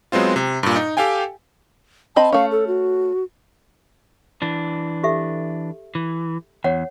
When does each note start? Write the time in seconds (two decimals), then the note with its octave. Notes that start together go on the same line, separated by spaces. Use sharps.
0.12 F#3 G#3 B3 C4 F4
0.36 C3
0.63 G2 A#2
0.76 D#4
0.97 G4 A4 F5 G5 G#5
2.16 C4 D#5 A5 B5
2.32 A3 C#4 F5
2.51 A4
2.67 F#4
4.42 E3 D4
5.03 G4 A4 E5
5.95 E3
6.64 E2 C#5 F#5